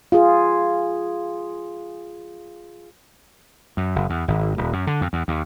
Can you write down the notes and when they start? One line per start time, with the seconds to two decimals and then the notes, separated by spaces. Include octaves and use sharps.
0.12 F4 G#4
3.77 F#2
3.96 F#1
4.10 E2
4.28 G#1
4.58 D#1
4.73 F#2
4.87 D3
5.01 F2
5.13 E2
5.28 D#2